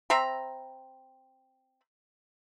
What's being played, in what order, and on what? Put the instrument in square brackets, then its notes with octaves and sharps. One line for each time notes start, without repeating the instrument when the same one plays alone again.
[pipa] C4 E5 A#5 B5